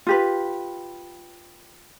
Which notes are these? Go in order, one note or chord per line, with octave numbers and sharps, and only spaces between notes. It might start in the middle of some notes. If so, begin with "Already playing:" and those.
F4 G4 B4